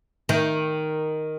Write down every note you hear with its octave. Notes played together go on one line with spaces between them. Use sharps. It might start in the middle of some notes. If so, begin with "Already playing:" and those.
D#3